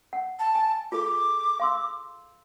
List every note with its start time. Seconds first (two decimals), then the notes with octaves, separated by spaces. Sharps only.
0.13 F#5
0.39 A5
0.55 G#5
0.92 F4 G#4 A4 D6
1.60 F5 C6 E6